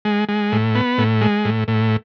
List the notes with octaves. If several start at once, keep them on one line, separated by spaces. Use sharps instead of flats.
G#3
G#3
A2
B3
A2
G#3
A2
A2